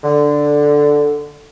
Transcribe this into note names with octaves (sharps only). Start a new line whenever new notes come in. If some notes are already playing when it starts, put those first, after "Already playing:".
D3